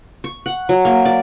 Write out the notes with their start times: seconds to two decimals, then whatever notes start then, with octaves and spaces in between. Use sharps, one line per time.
0.24 C#6
0.46 F#5
0.69 F#3
0.85 A#3
1.05 D5